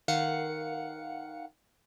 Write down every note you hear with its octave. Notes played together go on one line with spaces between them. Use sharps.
D#3 F5 F#5 C#7